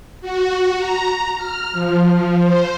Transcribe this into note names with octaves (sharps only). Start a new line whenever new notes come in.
F#4
A#5
F6
F3
C5